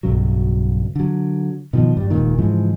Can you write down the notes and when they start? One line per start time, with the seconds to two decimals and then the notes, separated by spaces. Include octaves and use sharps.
0.03 B1 G2 C#3 F#3
0.96 D3 F#3
1.73 B2 D#3 F3
1.97 G2 G3
2.10 D#1 C#2 A#2 D#3
2.38 G#2 C#3 E3 F3